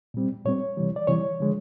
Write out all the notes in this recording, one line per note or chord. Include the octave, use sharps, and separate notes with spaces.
A#2 G3 C4
A#2 G3 C4 C#5
C3 E3 G3
D5
C3 E3 G3 C#5
D3 F3 G#3